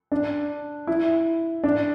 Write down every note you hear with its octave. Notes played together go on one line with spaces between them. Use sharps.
D4
E4
D4